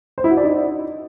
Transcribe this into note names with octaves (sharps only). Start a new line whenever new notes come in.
C5
E4
F#4
D5
D#4